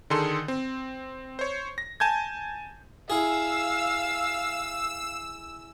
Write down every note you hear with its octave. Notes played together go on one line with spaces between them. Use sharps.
D3 D#3 D#4 G#4 A4 C6
C4
C5 C#5
A#6
G#5 A5 G6 G#6
E4 G#4 F5 E6